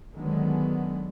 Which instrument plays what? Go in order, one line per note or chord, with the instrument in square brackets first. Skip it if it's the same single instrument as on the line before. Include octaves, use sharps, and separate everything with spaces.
[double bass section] D3 D#3 F#3 G#3 B3